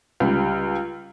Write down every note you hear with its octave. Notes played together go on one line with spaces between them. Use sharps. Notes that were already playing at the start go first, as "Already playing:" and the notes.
C#2 G3